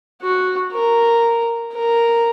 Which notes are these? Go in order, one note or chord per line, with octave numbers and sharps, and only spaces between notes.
F#4
A#4
A#4